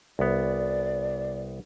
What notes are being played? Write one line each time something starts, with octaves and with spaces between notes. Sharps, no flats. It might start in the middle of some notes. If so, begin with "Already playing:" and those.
C2 B3 D5